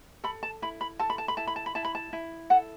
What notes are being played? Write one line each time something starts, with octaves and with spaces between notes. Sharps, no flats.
A4 B5
A5
E4 B5
B5
A4 A5
B5
A5
B5
E4 A5
B5
A5
B5
E4 A5
B5
A5
E4
A4 F#5